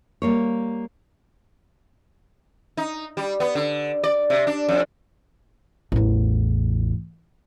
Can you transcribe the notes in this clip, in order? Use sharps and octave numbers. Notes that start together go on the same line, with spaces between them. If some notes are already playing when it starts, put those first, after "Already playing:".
G3 A#3 C#5
D#4
G3
B3
D3
D5
C3
D4
F2
A1 E2